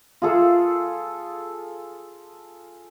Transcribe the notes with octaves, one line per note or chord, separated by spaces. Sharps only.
F4 G#4 A4